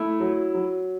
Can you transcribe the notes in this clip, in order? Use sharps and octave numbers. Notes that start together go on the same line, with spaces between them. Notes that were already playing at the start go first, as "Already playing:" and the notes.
Already playing: A3 E4
F#3
F#3